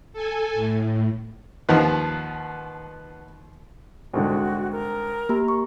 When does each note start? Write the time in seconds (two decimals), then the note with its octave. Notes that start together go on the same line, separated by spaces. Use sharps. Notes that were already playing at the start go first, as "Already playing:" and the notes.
0.13 A4 G#5
0.55 A2
1.69 D#2 D#3 F3 B4 F#5 A5
4.13 C2 G#2 D3 F#4
4.72 A#4
5.29 A#3 G4 A#5
5.48 C#6